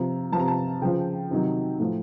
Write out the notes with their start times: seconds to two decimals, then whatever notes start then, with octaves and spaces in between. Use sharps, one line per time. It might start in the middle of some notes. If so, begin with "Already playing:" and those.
Already playing: C3 F3 A#5
0.32 F3 A5
0.37 C3 A#5
0.48 A5
0.82 C#3 F3 G5
1.31 C3 D#3 F#3
1.80 A2 F3